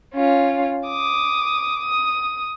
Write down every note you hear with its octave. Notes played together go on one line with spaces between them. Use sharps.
C#4 F4
D6 D#6
D#6